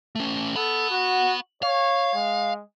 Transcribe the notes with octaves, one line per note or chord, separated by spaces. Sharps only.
A3 C#4
A4 F#5 B5
F#4
C#5 F5
G#3